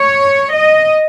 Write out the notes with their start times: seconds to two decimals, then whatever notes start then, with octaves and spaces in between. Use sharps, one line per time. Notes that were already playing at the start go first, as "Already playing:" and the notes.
Already playing: C#5
0.54 D#5